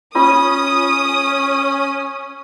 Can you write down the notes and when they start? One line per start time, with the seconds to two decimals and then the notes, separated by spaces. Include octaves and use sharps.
0.15 C#4 F4 D#6